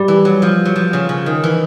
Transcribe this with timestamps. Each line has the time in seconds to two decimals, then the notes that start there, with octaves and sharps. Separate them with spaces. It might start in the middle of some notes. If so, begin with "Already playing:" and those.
Already playing: G3
0.08 E3
0.25 F#3
0.42 F3
0.65 F#3
0.76 F3
0.93 C#3
1.09 C#3
1.26 D#3
1.44 E3